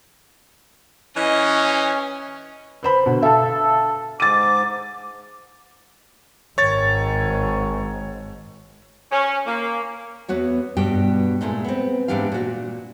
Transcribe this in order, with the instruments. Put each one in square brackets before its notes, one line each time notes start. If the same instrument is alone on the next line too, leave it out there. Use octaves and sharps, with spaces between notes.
[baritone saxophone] E3 [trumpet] C#4 [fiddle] D#5
[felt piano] B4 C5 B5
B2 D3
[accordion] A4 [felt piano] E5 F5 A5
[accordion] G#2 [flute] D6 [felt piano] A6 D#7
[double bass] G#1 G#2 [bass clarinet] D#3 [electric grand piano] C#5 A6
[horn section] C#4
A#3
[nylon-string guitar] E2 B3 F#4 C#5
G2 B2 G4 G5
A#2 G#3 A3 D#4
B3 C4
G#2 E3 B3 D4 G4 F5
A#2 F#4